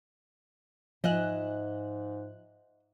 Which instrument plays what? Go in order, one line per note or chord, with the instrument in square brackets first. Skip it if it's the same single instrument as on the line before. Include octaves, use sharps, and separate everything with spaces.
[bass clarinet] G#2 [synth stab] F3 F#6 [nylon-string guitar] D#5 E5 G#5